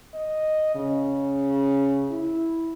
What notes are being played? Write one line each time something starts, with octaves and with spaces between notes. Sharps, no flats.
D#5
C#3
E4